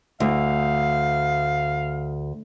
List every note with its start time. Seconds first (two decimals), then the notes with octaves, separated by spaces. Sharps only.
0.20 D2 F5